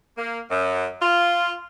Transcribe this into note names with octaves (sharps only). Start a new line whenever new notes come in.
A#3
F#2
F4